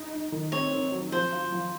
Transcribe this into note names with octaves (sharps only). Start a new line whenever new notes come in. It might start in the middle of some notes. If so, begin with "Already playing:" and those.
Already playing: D#4
D#4
D#3
C4 C#5
C4
F#3
F3 C5
F4
F3